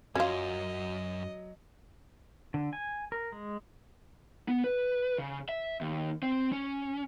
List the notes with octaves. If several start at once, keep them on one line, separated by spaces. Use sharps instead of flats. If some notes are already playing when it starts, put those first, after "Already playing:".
F#2 F#3 C#4 F4 D#5
D3
G#5
A#4
G#3
B3
B4
C#3
E5
D#2
C4
C#4